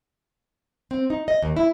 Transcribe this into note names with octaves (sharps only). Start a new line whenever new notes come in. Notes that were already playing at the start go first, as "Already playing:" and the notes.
C4
D#4
D#5
D#2
E4